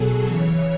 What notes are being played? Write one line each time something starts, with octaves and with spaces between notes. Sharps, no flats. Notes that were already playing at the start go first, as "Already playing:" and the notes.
Already playing: B2 F#3 G#4 A4
C#3 E3 C#5